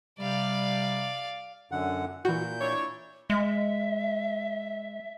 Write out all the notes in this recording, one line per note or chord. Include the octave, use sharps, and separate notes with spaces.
C3 G3 D5 F5
F#2 D3 F#5
A#2 E3 F#4 G6
D4 E4 C#5
G#3 E5